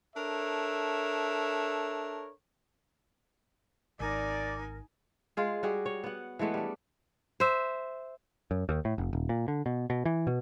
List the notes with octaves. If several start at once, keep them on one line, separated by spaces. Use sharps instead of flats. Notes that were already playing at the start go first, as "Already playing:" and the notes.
D4 A4 A#4 C#5 E5
G#1 D#4 A#4 D5 G#5
G#3 F4 G#4
G3 F#4 G#4
C#5
B3 F#5
E3 G#3 A3 B3
G3 D4
C5 E5
F#2
D#2
A2
F1
D#1
A#2
D3
B2
B2
E3
B2